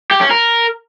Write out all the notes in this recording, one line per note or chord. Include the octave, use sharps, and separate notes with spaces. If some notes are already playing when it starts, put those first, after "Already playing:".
G4
C#4
A#4